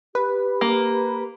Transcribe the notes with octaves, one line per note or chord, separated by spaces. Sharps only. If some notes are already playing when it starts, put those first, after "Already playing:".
G4 B4
A#3